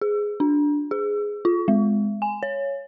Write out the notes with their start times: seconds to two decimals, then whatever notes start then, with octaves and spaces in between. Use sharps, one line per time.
0.01 G#4
0.40 D4
0.91 G#4
1.45 F4
1.68 G#3
2.22 G#5
2.43 C#5